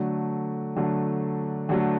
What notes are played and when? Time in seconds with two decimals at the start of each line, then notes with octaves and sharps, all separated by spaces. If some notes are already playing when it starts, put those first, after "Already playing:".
Already playing: D3 F#3 A3
0.76 D3 F#3 A3
1.69 D3 F#3 A3